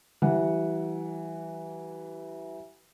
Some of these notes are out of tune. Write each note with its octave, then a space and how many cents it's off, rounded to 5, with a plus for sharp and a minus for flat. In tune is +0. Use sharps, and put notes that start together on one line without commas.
E3 +0 G3 -35 F#5 -5